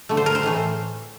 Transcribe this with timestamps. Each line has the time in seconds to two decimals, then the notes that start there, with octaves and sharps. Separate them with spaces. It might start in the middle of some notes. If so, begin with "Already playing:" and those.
0.09 D3 A3
0.17 C5
0.26 A#4
0.35 C5
0.43 A2 E3 A3